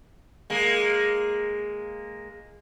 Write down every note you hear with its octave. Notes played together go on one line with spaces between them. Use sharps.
G#3 A#3